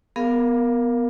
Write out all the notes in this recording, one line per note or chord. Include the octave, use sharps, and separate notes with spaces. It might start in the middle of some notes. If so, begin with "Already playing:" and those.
B3 G#4 A#4 F5